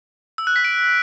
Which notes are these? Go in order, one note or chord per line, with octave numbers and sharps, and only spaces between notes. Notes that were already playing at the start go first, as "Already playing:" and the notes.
E6
F#6
B6
D7